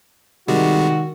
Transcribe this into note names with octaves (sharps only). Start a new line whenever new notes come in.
C3 D#3 G3 G#3 F#4